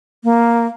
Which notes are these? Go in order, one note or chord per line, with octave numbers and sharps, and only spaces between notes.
A#3